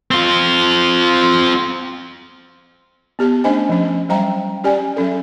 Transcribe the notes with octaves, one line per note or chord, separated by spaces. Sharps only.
C4 F4
B3 G4 A5
A3 C#4 D4 C5 D#5 G#5
F3 C#4
F#3 G3 C5 D#5 G5 A#5
C#4 G4 D5 G#5
F#3 C#4 A4